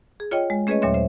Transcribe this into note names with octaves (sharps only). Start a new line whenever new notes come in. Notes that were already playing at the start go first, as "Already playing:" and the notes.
G#4
F4 C#5 D#5 G5
G#3
A3 C#4 G#4 B4 C#5 D#5
D#2 A#2 F#3 C#5 E5 C6
C5 E5